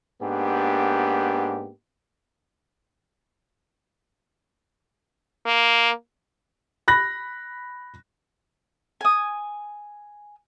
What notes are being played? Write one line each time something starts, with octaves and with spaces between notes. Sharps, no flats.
G#2 A#3 B3 D4 G4
A#3
B5 F#6 A#6
G#5 D#6